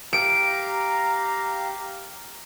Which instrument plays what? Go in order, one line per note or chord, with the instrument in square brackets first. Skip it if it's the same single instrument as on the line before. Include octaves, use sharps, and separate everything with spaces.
[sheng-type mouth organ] G4 F5 [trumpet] A#5 [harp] D7